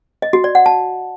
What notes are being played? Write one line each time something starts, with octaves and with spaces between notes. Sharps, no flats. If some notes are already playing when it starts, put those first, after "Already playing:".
D#5
F#4
D5
F#5
A5